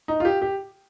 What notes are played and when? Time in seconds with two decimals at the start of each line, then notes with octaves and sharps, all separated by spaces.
0.08 D#4
0.20 F4
0.25 G4
0.42 G4